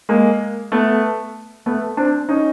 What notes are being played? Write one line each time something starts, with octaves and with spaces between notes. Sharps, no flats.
G#3 A#3
A3 B3
A3 B3
C4 D4
C#4 D#4